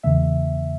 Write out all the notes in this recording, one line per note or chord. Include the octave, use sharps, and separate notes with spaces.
E2 C#3 E3 A#3 E5